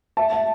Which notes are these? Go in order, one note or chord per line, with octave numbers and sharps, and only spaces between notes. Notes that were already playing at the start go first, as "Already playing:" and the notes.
E5 A5
E5